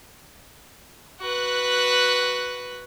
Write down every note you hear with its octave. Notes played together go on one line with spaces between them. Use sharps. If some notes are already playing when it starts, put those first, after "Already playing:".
F#4 B4